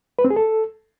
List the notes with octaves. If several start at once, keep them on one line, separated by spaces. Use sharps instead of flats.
B4
C4
G#4
A4